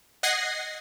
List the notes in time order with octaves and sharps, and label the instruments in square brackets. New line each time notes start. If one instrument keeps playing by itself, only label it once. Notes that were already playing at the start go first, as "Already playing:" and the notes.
[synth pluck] D#5 F#5 F#6 G#6 A#6 C7